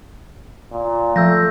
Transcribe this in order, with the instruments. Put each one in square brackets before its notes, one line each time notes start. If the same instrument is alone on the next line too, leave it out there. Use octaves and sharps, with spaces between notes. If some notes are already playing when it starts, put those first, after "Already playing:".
[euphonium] A#2
[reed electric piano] F3 [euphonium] A3 [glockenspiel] E6 G6 A#6